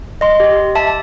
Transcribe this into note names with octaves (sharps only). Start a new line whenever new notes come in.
D#5 C6
G4
E5 A5